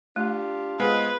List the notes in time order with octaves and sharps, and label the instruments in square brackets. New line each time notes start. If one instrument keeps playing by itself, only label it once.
[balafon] A3 [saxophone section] D4 F4 G4
[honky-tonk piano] G#3 B3 F4 [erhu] B4 [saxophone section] C5 D#5